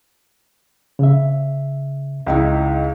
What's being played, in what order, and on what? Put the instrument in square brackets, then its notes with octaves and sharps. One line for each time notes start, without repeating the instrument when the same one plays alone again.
[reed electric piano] C#3 E5
[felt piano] C#2 D#4 E4